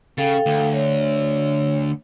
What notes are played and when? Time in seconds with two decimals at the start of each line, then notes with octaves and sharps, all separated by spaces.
0.18 C#3 A4 F5 G5
0.46 D2
0.74 C#5